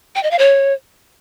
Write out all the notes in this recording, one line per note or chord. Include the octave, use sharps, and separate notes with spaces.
G5
D#5
F5
C#5